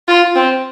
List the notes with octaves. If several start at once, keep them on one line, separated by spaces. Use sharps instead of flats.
F4
C4